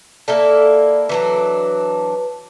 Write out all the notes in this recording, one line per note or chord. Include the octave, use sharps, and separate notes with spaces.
A#3 E4 A4 D5
E3 F#3 D4 B4